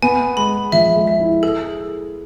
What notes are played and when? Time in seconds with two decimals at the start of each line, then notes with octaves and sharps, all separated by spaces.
0.02 B3 G#5
0.37 G#3 B5
0.72 F3 E5
0.96 G#3
1.07 E5
1.20 E4
1.43 G#4 A4